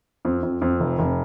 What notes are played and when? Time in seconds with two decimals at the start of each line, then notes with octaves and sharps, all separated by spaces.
0.25 F2
0.43 F2
0.62 F2
0.80 F1
0.99 F1